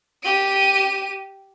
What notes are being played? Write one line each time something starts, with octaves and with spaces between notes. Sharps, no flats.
G4 D#7